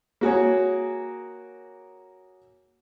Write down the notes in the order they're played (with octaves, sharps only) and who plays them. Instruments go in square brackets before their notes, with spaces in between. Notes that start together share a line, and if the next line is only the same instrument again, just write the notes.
[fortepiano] A#3 F#4 G#4 C#5